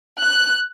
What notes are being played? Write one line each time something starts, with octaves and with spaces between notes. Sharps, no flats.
F#6